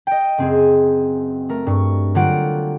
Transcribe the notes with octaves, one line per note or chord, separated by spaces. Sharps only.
D#5 G5
F#1 C4 G#4
A3 A#4
G2 C#6
D3 F#3 G3 F4 F#5 D7